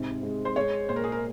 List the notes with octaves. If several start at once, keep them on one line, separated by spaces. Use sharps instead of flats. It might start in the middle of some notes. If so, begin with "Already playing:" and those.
Already playing: G#2 C3
G#3
C5
G#3 C#5
A#2 C5
A#4
G#4
A#4